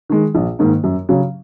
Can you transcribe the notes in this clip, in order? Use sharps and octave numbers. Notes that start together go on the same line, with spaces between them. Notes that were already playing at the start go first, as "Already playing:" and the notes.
D#3 G#3
A#1
G#2 D#3 A#3 D#4
F#2
C#3 F#3 C#4